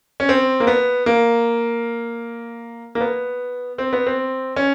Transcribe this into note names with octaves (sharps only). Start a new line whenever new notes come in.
C#4
C4
A#3
B3
A#3
A#3
B3
C4
B3
C4
C#4